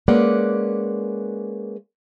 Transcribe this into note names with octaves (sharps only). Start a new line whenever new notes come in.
G#3 A#3 C#4 B4 D5 F#5